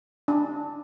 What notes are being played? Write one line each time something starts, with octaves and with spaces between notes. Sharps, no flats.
D4